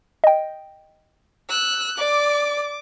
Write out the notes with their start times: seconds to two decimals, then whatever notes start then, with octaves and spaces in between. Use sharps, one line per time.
0.24 D#5 G5
1.49 E6 F#6
1.98 D5 D6